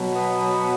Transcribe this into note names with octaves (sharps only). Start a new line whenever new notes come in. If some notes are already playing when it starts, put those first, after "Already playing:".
Already playing: B2 F#3
B3